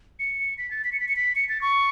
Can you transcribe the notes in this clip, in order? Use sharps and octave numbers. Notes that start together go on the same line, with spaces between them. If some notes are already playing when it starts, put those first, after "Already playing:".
C#7
B6
A6
B6
C#7
B6
C#7
B6
C#7
A6
C#6